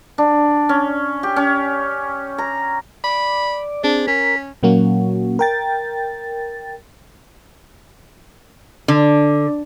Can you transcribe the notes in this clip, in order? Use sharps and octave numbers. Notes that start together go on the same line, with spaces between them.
D4
C#4
G4
C#4
A#5
D5 B5
C4 D4 G#4
C#4 A#4 B6
A#2 F#3 A#3 C#4 F#4
A#4 G5 A6
D3